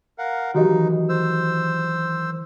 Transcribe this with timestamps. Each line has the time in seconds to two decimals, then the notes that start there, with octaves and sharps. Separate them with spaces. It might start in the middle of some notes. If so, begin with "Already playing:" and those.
0.18 A#4 F5 F#5
0.54 D#3 E3 F#3 D#4 F#4 G4 D#5
1.09 C5 E6